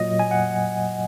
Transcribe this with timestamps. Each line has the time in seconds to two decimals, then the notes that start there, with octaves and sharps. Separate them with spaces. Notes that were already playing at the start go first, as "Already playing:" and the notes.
Already playing: A#2 F#3 D#5
0.19 G#5
0.31 F#5